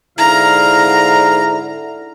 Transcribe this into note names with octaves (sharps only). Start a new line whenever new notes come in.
G#2 D3 E4 F5 A#5